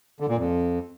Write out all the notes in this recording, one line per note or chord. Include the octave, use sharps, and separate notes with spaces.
D3
A#2
F2